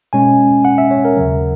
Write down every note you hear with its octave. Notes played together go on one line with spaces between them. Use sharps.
B2 G#3 C#4 G#5
F#5
E5
C#5
A#4
D#2 C#3 F#3